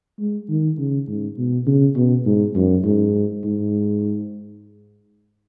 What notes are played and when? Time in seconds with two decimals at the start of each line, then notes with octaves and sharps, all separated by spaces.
0.19 G#3
0.49 D#3
0.78 C#3
1.08 G#2
1.38 B2
1.67 C#3
1.96 B2
2.26 G#2
2.56 F#2
2.85 G#2
3.44 G#2